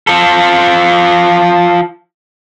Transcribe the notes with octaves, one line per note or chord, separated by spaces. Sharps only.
F3 A4